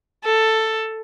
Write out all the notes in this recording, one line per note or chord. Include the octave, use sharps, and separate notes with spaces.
A4